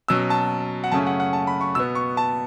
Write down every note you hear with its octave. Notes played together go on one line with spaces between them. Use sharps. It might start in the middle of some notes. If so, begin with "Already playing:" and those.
B2 F#3 C#4 E6
A5
F#5
F#2 C#3 A3 C#4 A5
F#5
F#5
A5
B5
C#6
B2 B3 E6
C#6
A5